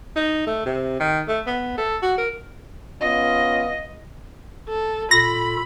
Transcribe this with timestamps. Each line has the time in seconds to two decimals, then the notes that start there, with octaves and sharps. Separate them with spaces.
0.16 D#4
0.47 A3
0.66 C3
1.00 D#3
1.28 A3
1.47 B3
1.78 A4
2.02 F#4
2.18 A#4
3.01 B3 C#4 F4 D#5
4.69 A4
5.11 A#2 F4 A4 B5 A#6